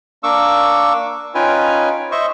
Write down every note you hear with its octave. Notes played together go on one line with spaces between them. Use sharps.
A#3 D4 C#6 D6 E6
C#4 D#4 F4 B4 G5 G#5
C5 D#5 E5 C#6